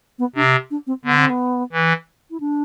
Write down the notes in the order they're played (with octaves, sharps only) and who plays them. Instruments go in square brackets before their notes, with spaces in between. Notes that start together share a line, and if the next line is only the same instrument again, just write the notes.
[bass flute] B3
[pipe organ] C3 [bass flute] D4
[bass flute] D4
C4
[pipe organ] D3 [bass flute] B3
[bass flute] C4
B3
[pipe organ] E3
[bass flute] E4
D4